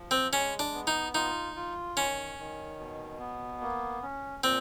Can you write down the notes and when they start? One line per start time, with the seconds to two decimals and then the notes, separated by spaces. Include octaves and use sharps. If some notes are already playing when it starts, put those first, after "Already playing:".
Already playing: F3
0.11 C4
0.32 G#3 C#4
0.59 D4
0.74 B3
0.87 D#4
1.15 D#4 F4
1.56 F4
1.96 D#3 C#4
2.38 D#3
2.79 B2
3.19 B3
3.61 A#3
4.02 C#4
4.43 A#2 C4